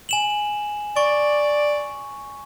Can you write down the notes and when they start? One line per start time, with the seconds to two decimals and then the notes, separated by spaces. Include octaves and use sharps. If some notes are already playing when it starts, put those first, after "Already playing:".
0.09 G#5 E7 F#7
0.97 D5 C#6